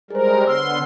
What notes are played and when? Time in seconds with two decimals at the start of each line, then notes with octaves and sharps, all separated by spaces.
0.10 G3 G#3 G#4 A#4 C5
0.45 D3 B3 C#5 C6 E6 F6